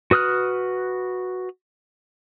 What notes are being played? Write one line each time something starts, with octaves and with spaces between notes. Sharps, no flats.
F#4 B4 D#6 F6 F#6